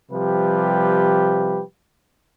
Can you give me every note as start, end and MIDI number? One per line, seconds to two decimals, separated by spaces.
0.11 1.61 48
0.11 1.61 53
0.11 1.61 55
0.11 1.61 67
0.11 1.61 71